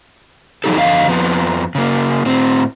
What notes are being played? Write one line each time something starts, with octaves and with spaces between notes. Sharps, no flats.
E3 F#3 C#4 D#4 G4 A4
F2 D3 D#5 F5
F2 F3 B3
C#3 A#3
A2 C4